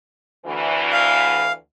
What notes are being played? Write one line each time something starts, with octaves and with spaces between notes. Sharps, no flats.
D2 E3
F5